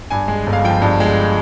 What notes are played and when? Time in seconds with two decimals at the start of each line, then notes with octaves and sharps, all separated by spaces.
0.10 G2 G#5
0.28 G#3
0.47 G1
0.53 F5
0.64 F3 G5
0.82 G2
1.00 G#3